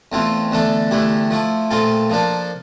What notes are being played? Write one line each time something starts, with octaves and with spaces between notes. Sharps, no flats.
E2 E3 A3 C4 F4
E2 D3 A3 D4 A4
E2 D3 A3 E4 G4
F3 A3 E4
A#2 A3 C4 F4 A4
F3 A#3 D4 A4